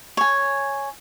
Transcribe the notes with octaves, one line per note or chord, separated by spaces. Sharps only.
C#5 G#5